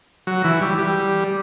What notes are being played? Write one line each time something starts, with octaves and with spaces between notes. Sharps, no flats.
F#3
E3
G3
G3